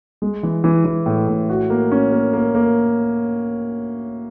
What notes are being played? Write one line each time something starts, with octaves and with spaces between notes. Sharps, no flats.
G#3
E3
E3
E3
A2
A2
F#4
A#3
C#4
A#3
A#3
A#3